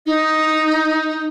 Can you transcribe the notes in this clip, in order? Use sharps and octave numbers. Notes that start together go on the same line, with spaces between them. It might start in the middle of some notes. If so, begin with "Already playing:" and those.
D#4